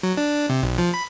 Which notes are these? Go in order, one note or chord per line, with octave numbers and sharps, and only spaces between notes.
F#3
D4
C3
B1
F3
B5